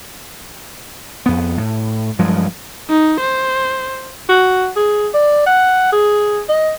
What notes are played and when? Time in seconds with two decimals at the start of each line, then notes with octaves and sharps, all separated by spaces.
1.26 F2 B3
1.58 A2
2.19 G2 F3 F#3 G#3
2.89 D#4
3.20 C5
4.29 F#4
4.76 G#4
5.14 D5
5.46 F#5
5.93 G#4
6.49 D#5